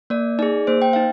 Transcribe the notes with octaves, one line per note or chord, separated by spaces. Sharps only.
A#3 D5
D#4 G#4 D5
A#3 C5
G5
D#4 F5